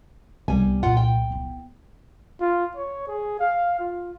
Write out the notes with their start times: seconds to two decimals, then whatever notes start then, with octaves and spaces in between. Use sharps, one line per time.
0.48 C2 G3 B3 G#5
0.83 A#2 F3 F4 F#5
0.97 G5
1.30 B3 E4
2.40 F4
2.76 C#5
3.08 G#4
3.40 F5
3.80 F4